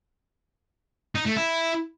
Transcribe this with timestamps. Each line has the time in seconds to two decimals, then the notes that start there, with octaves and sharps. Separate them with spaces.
1.15 D#4
1.26 A3
1.37 E4